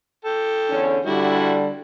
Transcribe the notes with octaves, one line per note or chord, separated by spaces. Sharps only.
A4 G5
E2 D3 C#4
D3 G3 E4 F#4